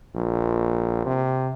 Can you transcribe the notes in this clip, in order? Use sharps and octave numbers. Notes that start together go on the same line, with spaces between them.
A#1
C3